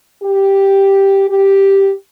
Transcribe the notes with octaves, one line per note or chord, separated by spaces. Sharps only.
G4
G4